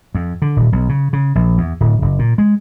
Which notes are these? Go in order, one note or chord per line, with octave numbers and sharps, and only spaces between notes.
F2
D3
D#1
B1
C#3
C#3
A#1
E2
D1
F#1
A#2
G#3